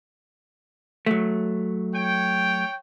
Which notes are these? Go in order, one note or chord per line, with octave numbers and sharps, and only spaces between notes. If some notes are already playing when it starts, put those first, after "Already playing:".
F#3 A3
C#5 G5